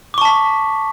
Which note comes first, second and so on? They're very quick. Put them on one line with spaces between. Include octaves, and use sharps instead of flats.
D6 C#6 A5 B6